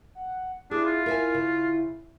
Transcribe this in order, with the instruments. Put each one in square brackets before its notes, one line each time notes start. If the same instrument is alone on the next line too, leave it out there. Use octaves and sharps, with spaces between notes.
[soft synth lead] F#5
[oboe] D4 [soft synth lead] E4 [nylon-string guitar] G#4
[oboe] F4
[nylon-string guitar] A#4 E5 G#5
C#3